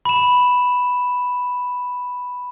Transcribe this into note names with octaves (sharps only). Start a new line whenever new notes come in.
B5 E7